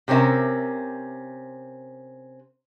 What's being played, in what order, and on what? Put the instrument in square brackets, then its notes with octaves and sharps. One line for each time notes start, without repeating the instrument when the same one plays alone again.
[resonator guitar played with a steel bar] C3 C4 C#4 A#4 E5